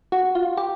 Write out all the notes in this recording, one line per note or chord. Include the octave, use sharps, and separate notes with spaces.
F#4
F4
G4